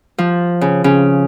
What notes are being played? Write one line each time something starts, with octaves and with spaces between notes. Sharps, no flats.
F3
C#3
C#3